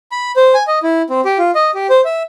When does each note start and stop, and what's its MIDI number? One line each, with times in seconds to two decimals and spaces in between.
0.12 0.32 83
0.36 0.54 72
0.54 0.63 80
0.67 0.79 75
0.83 1.02 64
1.10 1.21 60
1.25 1.38 67
1.38 1.51 65
1.55 1.71 75
1.75 1.87 67
1.90 2.01 72
2.05 2.23 76